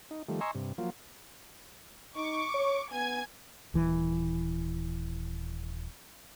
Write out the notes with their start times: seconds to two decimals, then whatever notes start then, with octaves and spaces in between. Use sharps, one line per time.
0.11 D#4
0.29 D#3 F3 G3 A3
0.41 D#5 G#5 A#5 C6 C#6 E6
0.55 G2 C3
0.78 F3 F#3 A#3 F4
2.16 D#4 C#6 D6
2.54 C#5
2.91 B3 G#5 G#6
3.74 D#1 E3